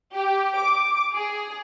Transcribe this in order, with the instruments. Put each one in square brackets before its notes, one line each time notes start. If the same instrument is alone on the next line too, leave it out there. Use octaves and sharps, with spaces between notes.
[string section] G4
D6
G#4